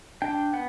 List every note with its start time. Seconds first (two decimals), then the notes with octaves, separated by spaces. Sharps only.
0.22 D4 G5
0.53 B3 F#5